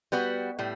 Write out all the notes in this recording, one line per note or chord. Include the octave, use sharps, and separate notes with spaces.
G3 B3 F#4 B4
A2 G3